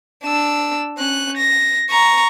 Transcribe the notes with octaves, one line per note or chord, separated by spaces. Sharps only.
D4 E6
C#4 F#6
A#6
A#5 C#6